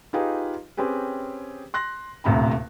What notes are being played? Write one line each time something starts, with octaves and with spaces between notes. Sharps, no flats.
D#4 F4 G4 G#4 B4 F5
C4 C#4 G4 G#4 B4
C6 F#6 A#6
D#1 A1 D2 C3 A#5 B5